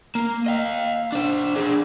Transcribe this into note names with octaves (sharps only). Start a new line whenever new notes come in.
A#3
D#5 F5
D4 C5
D4 G#4